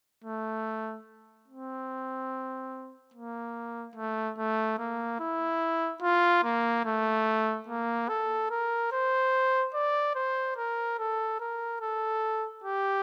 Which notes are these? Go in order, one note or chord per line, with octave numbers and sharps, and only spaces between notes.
A3
C4
A#3
A3
A3
A#3
E4
F4
A#3
A3
A#3
A4
A#4
C5
D5
C5
A#4
A4
A#4
A4
G4